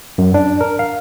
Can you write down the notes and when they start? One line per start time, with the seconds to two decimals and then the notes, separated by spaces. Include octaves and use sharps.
0.18 F#2
0.34 D4
0.61 A#4
0.79 F5